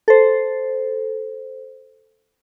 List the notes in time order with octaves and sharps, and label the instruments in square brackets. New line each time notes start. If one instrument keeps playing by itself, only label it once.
[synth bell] A4 C5